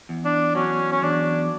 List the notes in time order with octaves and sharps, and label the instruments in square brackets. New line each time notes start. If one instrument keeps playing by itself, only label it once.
[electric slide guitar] E2
[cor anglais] D4
[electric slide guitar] F#3 [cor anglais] C#4
[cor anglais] C#4
[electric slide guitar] E2 [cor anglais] D4